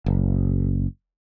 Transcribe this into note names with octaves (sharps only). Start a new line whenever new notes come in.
F#1